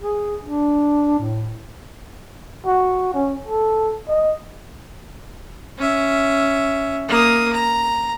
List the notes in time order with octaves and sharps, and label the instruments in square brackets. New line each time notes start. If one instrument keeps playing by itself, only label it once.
[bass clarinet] G#4
D4
A2
[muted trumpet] F#4
C#4
A4
D#5
[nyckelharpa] C#4 E5
A#3 D#6
A#5